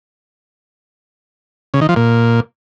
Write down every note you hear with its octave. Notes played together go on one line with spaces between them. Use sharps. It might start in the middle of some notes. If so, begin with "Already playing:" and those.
C#3
D#3
F3
A#2